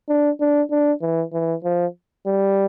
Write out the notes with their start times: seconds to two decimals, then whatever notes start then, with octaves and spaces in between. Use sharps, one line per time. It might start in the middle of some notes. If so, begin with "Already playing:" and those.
0.09 D4
0.40 D4
0.71 D4
1.02 E3
1.33 E3
1.64 F3
2.26 G3